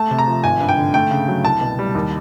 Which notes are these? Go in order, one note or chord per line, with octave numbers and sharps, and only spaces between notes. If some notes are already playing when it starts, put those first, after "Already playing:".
Already playing: A3 A5
C3
A#5
F3
G#1 G#5
G2
G5
D3
A3 G5
C#3
F#3
C2 A5
B2
G3
D#2